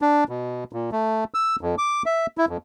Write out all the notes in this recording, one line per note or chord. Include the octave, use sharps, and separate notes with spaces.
D4
B2
A#2
A3
E6
F2
D6
E5
E4
F2